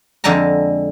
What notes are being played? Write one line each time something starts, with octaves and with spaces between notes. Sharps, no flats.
F2 D3 G#3 A5 A#5